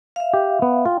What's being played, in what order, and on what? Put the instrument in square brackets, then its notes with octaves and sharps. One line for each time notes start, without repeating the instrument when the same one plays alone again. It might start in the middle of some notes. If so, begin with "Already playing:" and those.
[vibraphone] E5 F5
[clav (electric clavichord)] G4
B3
[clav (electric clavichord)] F4 [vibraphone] G5